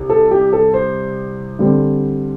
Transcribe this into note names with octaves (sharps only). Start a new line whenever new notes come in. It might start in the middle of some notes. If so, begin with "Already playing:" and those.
Already playing: C2
A4
G4
A4
C5
D3 G3 C4